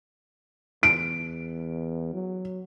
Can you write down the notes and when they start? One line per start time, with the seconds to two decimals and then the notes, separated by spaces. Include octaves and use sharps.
0.83 E2 D7
2.14 F#3